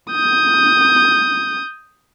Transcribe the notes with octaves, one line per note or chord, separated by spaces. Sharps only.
D#6 G6